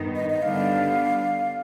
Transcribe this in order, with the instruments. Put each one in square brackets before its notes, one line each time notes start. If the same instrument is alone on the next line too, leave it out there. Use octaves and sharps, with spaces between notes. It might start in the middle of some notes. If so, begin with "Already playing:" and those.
Already playing: [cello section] G2 D#3 B3 D#4
[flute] D#5
D#5
[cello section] D3 G3 B3 D4 [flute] F5